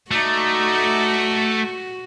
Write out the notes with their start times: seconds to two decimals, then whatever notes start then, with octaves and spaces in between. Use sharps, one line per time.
0.11 A3 D#4 F#4 D5